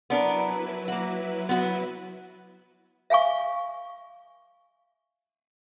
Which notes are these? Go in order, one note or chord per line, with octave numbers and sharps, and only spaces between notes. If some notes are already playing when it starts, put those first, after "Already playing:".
F#3 B3 D4 E4 A#4 B4
A#3 F#4
B3 F#4
E5 F5 G#5 C#6